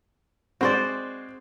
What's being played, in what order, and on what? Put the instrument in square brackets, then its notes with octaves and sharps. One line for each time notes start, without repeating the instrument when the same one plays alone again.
[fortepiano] G#3 C4 [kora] F#4 C5 D5